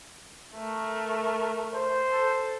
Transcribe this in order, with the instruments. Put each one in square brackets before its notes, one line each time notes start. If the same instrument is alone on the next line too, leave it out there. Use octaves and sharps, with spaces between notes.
[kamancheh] A3 A#4
[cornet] C5
[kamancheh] A4